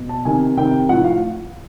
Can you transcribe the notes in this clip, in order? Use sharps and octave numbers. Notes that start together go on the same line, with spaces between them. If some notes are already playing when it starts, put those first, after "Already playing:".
Already playing: B2
A5
C3 D#3 G#5
C3 D#3 G5
A2 F3 F#5
F5